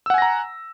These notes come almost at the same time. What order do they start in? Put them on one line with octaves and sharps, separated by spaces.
E6 F#5 G#5 A#6 A#5